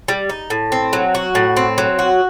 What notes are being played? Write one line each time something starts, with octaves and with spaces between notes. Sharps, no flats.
G3
D#4
A2
C4
F#3
F#4
A2
C4
F#3
F#4